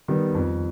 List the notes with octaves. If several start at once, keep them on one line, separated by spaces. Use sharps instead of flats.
D#3 G3 B3
F2